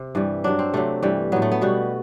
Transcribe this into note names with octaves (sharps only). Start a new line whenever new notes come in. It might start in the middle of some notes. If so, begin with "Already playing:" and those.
Already playing: C3
G2 E3 G3
G2 F#3 D4
C4
C3 F#3 A3
G2 E3 G3
A2 F#3 B3
A3
B3
B2 G3 F#4